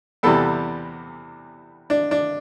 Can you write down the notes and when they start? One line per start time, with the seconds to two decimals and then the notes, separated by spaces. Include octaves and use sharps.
0.23 E2 C3 E3 G3 B3 A4
1.90 D4
2.11 D4